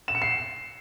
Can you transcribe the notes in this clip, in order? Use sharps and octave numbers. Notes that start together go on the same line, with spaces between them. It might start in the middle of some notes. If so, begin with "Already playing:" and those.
E7
C#7
C7